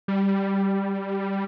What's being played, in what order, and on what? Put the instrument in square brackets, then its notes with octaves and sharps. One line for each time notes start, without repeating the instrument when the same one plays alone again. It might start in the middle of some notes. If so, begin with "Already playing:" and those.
[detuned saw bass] G3